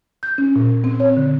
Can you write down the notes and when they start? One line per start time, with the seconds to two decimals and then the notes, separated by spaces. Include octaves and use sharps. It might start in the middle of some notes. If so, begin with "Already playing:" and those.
0.23 G6
0.38 C#4
0.56 A#2
0.84 C4
1.00 C#5
1.17 D3